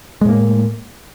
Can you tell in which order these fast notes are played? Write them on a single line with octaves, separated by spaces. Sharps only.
G#3 A2 A#3